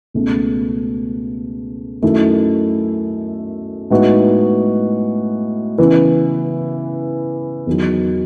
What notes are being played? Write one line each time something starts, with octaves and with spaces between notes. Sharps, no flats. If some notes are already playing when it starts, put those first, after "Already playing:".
C#2 B2 A3
F#2 D#3 A3 E4
A2 G#3 B3 D#4 F#4
C#3 E3 B3
E2 D#3 F#3